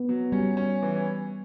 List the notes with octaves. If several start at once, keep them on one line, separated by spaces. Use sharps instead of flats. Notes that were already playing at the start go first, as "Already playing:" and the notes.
Already playing: B3
F#3
G3 C#4
C#4
E3